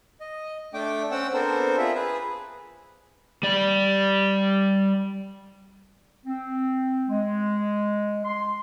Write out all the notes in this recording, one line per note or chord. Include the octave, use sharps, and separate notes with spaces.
D#5
A3 D4 G5 D6
C4 C#4 F#5 G5 E6
B3 C4 D4 A4 A#4 C5
F4 G#4 E5
G#4 B4
G3 D5
C4
G#3
C6